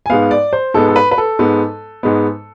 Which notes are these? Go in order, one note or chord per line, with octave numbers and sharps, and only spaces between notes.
G#5
G#2 G#3 B3 F5
D5
C5
G#2 G#3 B3 A4
A4
B4
B4
A4
G#2 G#3 B3
G#2 G#3 B3